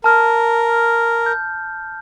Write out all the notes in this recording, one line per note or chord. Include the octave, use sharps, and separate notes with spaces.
A#4 A5 F6
G6